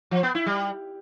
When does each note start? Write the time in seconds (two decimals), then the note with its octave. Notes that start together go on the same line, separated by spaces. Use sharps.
0.11 F3
0.23 B3
0.35 E4
0.46 G3